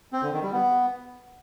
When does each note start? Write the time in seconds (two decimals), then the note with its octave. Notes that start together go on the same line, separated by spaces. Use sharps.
0.13 C4
0.23 D3
0.33 D#3
0.43 G3
0.53 B3